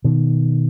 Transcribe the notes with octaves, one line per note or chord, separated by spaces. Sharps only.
B2 D#3